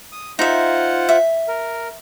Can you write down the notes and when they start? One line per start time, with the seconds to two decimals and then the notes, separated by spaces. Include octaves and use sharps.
0.12 D#6
0.39 D#4 F4 C5 E5 F#5
1.09 E5
1.48 A#4